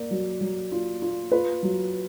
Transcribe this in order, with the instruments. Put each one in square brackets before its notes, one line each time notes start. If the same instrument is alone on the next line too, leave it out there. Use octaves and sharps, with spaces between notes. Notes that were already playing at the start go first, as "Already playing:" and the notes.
Already playing: [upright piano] A#3 D5
F#3
F#3
F4
F4
F4 B4
F#3